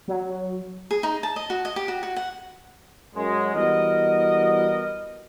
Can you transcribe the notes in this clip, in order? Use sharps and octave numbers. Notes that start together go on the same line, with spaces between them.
F#3
G#4
D#4
A5
D#5
F#4
D#5
G4
F#4
F#4
F#5
F#2 G#3
E3 G3 B3 F#4 A#4 D#5